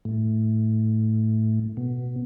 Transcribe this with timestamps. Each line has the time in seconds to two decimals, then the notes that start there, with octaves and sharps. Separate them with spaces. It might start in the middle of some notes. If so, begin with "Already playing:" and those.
0.05 A2
1.77 B2